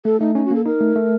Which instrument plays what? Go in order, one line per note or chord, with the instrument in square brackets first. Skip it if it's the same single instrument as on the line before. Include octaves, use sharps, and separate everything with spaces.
[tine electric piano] A3 [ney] A4
[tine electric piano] A3 [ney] D#4
[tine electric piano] C#4 [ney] D#4
[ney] F#4
[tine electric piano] A#3 [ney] A4
[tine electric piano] D#4 [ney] A#4
[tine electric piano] A3
A3